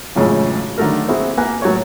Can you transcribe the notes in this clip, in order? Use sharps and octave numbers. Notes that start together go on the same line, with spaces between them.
A#1 F#2 A2 C#3 E3 G#3
D3 D#3 F#3 A3 A#4
A#3 C4 E4 F#4 G#4
A#3 B4 F#5 G#5 F#6
A2 F#3 A#4 C#5